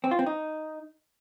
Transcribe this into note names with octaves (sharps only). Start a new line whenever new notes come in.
C4
F4
C4
D#4